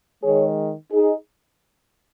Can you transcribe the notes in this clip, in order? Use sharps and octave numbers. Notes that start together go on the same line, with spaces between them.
D#3 G#3 G#4 C#5
D#4 G#4